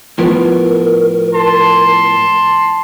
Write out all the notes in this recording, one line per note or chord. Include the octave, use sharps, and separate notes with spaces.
A2 F3 B3 A#4
A5 C6